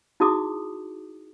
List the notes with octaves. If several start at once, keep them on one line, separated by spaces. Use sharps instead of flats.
D#4 E4 F#4 G#4 D6 D#6